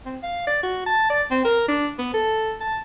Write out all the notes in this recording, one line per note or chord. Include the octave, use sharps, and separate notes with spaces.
C4
F5
D5
F#4
A5
D5
C4
A#4
D4
B3
A4
A5